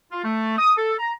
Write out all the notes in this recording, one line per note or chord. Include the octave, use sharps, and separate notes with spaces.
F4
A3
D#6
A4
A#5